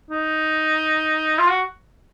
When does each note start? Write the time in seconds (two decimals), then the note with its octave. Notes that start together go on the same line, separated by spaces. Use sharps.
0.11 D#4
1.38 F4
1.49 F#4